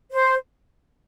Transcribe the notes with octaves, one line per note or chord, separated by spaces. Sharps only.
C5